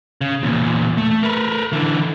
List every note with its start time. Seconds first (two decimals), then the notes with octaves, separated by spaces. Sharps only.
0.21 C#3
0.43 E2 A#2
0.97 A3
1.23 A#4 B4
1.73 D3 E3